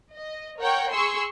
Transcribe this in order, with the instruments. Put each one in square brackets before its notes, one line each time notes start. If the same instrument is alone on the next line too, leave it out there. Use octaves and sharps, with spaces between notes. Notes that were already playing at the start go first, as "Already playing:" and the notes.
[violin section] D#5
A#4 C#5 F#5 G5
G#4 C6 C#6 E6